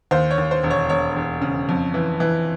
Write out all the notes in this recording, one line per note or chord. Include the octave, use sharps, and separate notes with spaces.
D#2 C5
C#5
D#2
C5
E1
C#5
E1 C#5
E1
C#3
F2
E3
E3